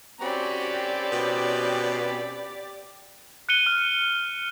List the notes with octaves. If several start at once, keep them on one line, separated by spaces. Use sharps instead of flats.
C4 C#4 F#4 G4 D5 B5
B2
F#6 C#7 D#7 G7
F6